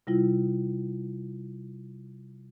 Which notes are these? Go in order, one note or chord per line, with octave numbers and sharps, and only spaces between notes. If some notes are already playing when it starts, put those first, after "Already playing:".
C3 G3 E4 F4